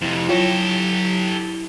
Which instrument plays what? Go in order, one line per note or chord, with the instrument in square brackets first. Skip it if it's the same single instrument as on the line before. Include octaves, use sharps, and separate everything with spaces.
[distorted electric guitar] F2 C3 [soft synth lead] E4
[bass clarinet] F#3 [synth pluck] F4 C#5 A#6 [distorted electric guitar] G4 A4